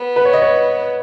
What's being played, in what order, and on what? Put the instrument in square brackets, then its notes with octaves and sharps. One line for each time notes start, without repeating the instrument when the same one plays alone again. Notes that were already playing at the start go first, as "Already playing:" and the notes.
Already playing: [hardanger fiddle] B3
[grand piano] B4
C#5
D#5
C#5